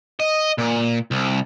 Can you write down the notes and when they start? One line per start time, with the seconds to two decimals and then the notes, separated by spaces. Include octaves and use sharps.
0.20 D#5
0.58 A#2
1.11 C2